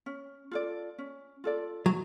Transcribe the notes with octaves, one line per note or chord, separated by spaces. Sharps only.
C#4
F4 A4 D5
C#4
F4 A4 D5
F#3